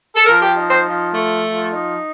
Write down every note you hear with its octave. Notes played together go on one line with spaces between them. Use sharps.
A4
F3 A#4
G4
D#4
C5
F3
A3
F3
D#4